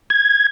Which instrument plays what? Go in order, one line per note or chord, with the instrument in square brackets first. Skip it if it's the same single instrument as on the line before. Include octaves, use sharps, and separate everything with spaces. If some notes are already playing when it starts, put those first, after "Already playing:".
[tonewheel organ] G#6